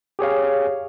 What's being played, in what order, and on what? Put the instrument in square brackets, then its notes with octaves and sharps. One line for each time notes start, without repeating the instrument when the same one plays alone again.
[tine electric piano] G4 G#4 C#5 F5